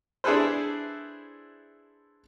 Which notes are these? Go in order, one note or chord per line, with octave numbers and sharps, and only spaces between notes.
D4 E4 G#4 A4 B4 C5